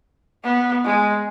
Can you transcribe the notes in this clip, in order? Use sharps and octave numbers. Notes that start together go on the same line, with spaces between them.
B3
G#3